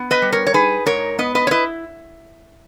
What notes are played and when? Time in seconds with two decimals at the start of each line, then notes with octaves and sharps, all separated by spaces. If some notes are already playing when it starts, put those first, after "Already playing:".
Already playing: B3
0.11 B4 D#5
0.22 G3
0.32 A#4 C#5
0.47 C#5
0.54 D#4 G#4 B4
0.86 G#2 A#4 C#5
1.19 B3 B4 D#5
1.35 B4 D#5
1.47 C#5
1.51 E4 B4 D#5